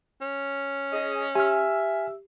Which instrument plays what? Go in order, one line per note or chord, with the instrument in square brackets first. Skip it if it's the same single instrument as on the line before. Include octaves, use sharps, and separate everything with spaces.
[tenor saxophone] C#4
[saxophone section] G#4 D#5
[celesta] G4 [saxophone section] E5 [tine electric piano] G#5 F6